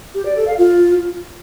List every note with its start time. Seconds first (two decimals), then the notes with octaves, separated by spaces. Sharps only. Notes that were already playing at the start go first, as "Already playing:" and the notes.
0.15 G4
0.26 D5
0.36 A4
0.47 F5
0.58 F4